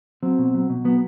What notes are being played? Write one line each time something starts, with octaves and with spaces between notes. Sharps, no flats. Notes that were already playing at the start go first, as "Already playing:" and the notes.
F#3 C4
B2
F#3
B2
F#3 B3